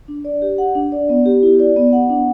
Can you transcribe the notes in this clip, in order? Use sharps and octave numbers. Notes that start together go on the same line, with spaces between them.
D4
D5
G4
F#5
D4
D5
B3
G4
E4
D5
B3
F#5
D4